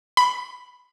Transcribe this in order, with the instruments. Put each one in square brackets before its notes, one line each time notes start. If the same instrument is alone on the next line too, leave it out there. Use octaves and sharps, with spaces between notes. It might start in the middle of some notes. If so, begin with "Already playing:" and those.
[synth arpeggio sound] B5